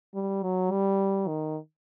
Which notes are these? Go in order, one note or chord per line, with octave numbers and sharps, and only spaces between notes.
G3
F#3
G3
D#3